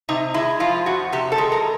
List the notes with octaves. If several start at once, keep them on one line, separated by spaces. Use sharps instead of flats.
C3 D#4
G#3 E4
F3 F4
F2 F#4
C3 G4
A4
G#3
A#4